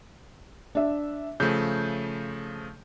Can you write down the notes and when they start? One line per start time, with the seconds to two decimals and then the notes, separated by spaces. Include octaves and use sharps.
0.75 D4 E5
1.40 C#3 F3 A3 G6